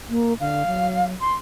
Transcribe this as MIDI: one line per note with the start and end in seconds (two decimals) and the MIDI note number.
0.09 0.34 58
0.40 0.63 50
0.40 1.07 77
0.67 1.13 54
1.20 1.33 84